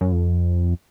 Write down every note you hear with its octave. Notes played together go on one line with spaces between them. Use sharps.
F#2
F2